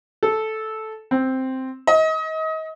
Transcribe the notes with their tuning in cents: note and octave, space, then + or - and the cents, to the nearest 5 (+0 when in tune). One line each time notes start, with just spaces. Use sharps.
A4 -10
C4 +0
D#5 +30